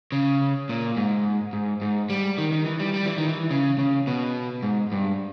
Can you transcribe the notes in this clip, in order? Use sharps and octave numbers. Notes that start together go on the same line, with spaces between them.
C#3
A#2
G#2
G#2
G#2
G3
D#3
D#3
E3
G3
G3
E3
D#3
E3
C#3
C#3
B2
G#2
G2